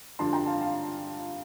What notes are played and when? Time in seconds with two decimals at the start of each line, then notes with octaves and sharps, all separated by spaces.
0.19 G2 D3 F3 A5 C6
0.33 G5 A#5
0.46 F5 A5
0.61 F5 A5